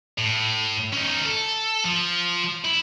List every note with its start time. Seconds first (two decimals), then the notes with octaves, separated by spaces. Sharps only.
0.18 A2
0.93 C#4 D#4
1.26 A4
1.85 F3
2.64 E4